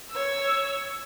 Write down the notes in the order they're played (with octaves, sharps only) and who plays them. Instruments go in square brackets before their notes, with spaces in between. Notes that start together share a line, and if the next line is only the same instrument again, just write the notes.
[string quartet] C#5 E6